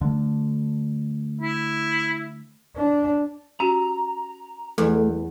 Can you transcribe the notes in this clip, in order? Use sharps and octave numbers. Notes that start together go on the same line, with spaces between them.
D3 A3
E4
D4
C#4 F#4 G4 A#5
E2 F3 A3